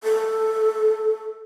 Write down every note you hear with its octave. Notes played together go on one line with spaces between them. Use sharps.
A4